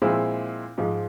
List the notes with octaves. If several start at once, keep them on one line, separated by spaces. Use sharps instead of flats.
A#2 F3 G#3 C4 E4
G#2 F3 G#3